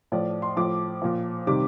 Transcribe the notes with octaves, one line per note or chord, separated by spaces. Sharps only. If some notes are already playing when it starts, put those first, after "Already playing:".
A2 F3 D5
C6
A2 F3 D6
A#2 F3
C3 D#3 G3 D6